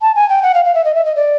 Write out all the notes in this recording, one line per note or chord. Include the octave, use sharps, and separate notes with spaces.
A5
G#5
G5
F#5
F5
F5
E5
D#5
E5
D#5
D5